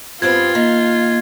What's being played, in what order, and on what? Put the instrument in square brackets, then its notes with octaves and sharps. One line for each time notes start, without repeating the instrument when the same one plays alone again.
[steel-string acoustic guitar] G2 B3 C4 [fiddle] F4 [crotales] G#6
[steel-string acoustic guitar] D#3 [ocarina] A#3